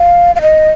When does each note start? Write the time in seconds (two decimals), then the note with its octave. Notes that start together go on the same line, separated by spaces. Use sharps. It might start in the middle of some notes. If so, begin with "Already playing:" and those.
Already playing: F5
0.36 F5
0.42 D#5